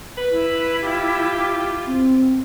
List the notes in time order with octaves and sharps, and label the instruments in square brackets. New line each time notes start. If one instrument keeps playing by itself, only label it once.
[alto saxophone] B4
[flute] E4
[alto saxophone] F4 [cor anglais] G4
[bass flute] C4